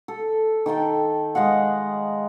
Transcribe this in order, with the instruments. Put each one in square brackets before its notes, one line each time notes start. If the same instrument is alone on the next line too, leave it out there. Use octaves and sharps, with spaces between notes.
[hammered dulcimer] A4
D#3 A4 G5 A5
G#3 D#5 F5 F#5